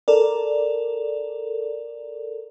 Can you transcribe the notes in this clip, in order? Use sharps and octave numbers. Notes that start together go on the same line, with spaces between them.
A4 A#4 D5